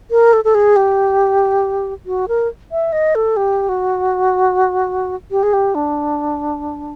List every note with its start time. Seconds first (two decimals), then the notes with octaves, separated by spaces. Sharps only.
0.11 A#4
0.33 A4
0.44 A4
0.55 G#4
0.76 G4
2.06 F#4
2.28 A#4
2.72 E5
2.92 D#5
3.15 A4
3.37 G4
3.69 F#4
5.31 G4
5.43 G#4
5.53 G4
5.75 D4